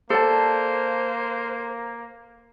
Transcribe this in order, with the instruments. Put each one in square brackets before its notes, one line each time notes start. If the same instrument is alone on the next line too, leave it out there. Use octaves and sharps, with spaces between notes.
[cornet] A#3 [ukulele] A4 D5 A5 [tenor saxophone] C5